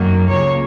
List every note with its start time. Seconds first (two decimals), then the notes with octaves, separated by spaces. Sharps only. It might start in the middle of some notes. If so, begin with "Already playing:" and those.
Already playing: F#2 D#3 F#3 A#3
0.28 C#2 C#3 A#3 C#5